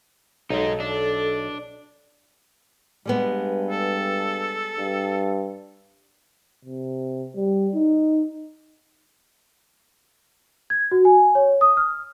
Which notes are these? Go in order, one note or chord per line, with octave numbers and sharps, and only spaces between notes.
B1 G#3 D#4 A4
D4
G2 G3 G#3 B3
A4
G2
C3
G3
D#4
G#6
F#4
G#5
C#5
D#6
F6